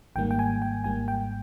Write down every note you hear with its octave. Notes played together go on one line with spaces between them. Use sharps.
G#1 G#2 D#3 G3 A#3 G5
G5
G#5
G5
G#1 G#2 G3 A#3 G#5
G5